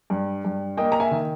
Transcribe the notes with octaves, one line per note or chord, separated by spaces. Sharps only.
G2
G2
A#3 D#5 G5
A#5
E5 G#5
D#3